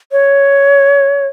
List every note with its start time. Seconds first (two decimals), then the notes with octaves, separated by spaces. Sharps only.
0.12 C#5